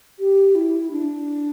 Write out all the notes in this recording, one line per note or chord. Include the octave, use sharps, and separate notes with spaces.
G4
E4
D4